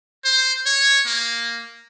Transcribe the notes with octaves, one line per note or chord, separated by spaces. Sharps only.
C5
C#5
A#3